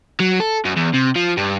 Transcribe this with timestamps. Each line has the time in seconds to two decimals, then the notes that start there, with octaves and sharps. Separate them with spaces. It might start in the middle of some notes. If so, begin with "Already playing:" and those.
0.20 F#3
0.40 A4
0.65 F#2
0.76 E2
0.93 C3
1.15 F3
1.37 G2